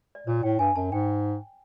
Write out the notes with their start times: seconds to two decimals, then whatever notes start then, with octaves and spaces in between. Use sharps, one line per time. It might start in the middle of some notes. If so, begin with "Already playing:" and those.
0.15 D5
0.27 A#2 C#5
0.43 A2 G5
0.59 G2 G#5
0.76 F#2 A5
0.92 G#2 G5